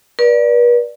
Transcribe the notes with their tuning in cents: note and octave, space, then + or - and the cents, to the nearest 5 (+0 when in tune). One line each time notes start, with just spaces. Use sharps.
B4 -45 D5 +0